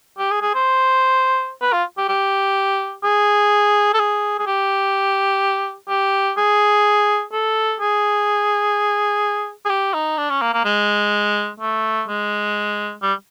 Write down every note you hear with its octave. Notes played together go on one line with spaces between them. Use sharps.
G4
G#4
G#4
C5
B4
F4
G4
G4
G#4
A4
G#4
G#4
G4
G4
G#4
A4
G#4
G#4
G4
D#4
D4
C#4
A#3
A#3
G#3
A3
G#3
G3